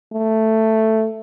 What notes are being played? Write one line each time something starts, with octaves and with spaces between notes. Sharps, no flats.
A3